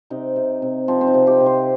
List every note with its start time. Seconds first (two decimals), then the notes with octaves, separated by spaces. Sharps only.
0.10 C3 D#4
0.36 C3
0.62 C3
0.88 F3 C4
1.01 C4
1.07 D#4
1.14 C3
1.27 G4
1.40 C3
1.46 C5